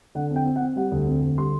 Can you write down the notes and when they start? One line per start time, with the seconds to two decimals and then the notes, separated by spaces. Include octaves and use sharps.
0.15 D3 F#5
0.31 C4 G5
0.46 C4
0.56 F#5
0.61 C4
0.76 G3 F#5
0.92 D2
1.07 C4
1.22 D2
1.37 G3 C6